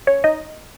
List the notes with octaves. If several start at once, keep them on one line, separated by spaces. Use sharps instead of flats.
C#4 C#5
D#4 D#5